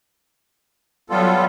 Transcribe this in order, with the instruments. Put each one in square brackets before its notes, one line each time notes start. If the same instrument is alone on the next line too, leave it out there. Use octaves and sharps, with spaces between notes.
[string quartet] F#3 G3 C#5 [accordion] B3 F4 A4